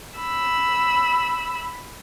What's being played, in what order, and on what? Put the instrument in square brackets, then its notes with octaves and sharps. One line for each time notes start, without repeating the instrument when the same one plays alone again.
[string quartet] B5 E6